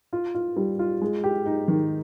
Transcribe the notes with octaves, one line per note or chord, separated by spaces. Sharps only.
F4
F4
G3
F4
G#3
G4
D#4
D#3